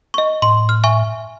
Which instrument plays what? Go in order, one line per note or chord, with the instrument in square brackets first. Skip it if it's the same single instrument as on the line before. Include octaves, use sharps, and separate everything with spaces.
[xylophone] D#5 C#6
[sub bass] A2 [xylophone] C6
[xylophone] F6
E5 G#5 C#6